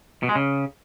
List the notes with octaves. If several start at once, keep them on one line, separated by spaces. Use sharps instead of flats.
B2
G#3
C#3